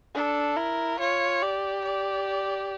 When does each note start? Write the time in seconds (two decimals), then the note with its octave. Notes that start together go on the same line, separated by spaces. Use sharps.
0.15 D4 A4
0.56 E4 A#4
0.99 F4 C#5
1.42 G4 D5
1.84 D5